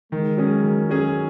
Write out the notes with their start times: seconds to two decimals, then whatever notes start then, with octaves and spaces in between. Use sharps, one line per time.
0.12 D#3 G#3
0.37 F#3 C#4 G#4
0.64 D#3
0.89 F#3 C#4 G#4